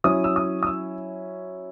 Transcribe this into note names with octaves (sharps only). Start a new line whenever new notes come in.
F#3 C#4 E4 D#6
E6
D#6
D#6
E6